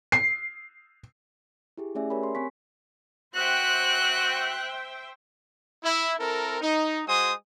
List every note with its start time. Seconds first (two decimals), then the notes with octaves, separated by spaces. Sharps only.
0.12 C7
1.77 E4 G4 G#4
1.95 A3 C#4 G#4 D5 E5 G#5
2.10 G4 A#4 C#5 G#5 B5
2.23 C6
2.35 C4 G#5 C6 C#6 B6
3.35 F#4 C5 E5 G5 F#6
5.84 E4
6.19 C4 E4 A4 A#4
6.61 D#4
7.07 G#3 F#4 C5 G#5 D#6